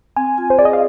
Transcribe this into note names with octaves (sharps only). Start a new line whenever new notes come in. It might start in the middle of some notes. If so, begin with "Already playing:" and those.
C4 G#5
F4
C5
G#4 D5
D#5
F5